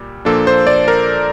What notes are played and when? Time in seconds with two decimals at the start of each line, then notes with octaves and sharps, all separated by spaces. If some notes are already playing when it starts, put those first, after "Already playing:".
Already playing: A#2 G3
0.25 A#2 F3 A#3 D4 A4
0.47 C5
0.67 D5
0.88 A#4